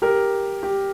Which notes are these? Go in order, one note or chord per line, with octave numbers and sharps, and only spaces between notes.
G4 A#4
G4